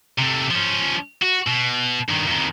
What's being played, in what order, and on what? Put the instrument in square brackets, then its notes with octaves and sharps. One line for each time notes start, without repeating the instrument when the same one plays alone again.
[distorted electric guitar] C3 A3
F3 C#4
F#4
B2
G2 D#3
F2 D#3